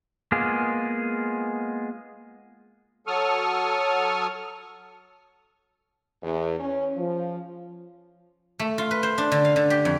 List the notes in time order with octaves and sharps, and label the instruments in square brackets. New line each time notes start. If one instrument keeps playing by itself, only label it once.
[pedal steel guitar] G#3 A#3 B3 F4 G#4
[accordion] F#3 A4 C#6 D#6 F6
[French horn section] E2
C#4
F3
[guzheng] A3
F4
B4
C5
D4
D3
F5
D3
G4
F2